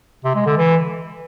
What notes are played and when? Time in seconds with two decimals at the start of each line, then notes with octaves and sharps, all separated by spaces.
0.24 C3
0.35 G#3
0.46 D3
0.57 E3